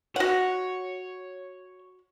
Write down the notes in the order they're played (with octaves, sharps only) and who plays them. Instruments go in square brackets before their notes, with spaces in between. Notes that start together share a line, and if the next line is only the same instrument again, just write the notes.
[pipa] F#4 F#5 [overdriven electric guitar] C#5